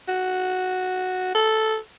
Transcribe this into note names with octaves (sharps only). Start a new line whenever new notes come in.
F#4
A4